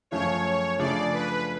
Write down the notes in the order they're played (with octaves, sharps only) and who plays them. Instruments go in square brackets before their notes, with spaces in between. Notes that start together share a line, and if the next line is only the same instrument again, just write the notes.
[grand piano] F#2 F3 A3 F4 [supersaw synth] C#5
[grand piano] C#3 F3 A3 D4 G#4 [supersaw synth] D5
[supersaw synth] B4